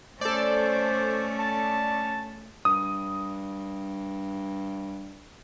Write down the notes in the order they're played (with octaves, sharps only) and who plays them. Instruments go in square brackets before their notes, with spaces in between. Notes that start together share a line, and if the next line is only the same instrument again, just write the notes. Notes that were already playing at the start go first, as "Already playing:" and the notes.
[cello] A3 C#4 [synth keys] A4 D5 [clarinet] C5
[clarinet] A5
[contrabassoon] G2 [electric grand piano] D#6